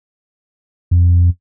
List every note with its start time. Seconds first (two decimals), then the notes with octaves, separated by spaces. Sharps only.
0.91 F2